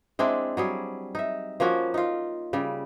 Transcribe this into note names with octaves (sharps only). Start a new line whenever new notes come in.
G#3 C4 D4 E4
F#3 G3 G#4
D#4 E5
F3 A#3 C#4 F#4
D#4 F4
C#3 G3